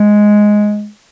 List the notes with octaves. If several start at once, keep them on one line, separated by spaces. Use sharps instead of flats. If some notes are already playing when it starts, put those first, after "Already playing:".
Already playing: G#3